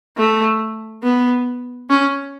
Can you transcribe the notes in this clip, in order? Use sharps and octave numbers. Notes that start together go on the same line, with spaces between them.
A3
B3
C#4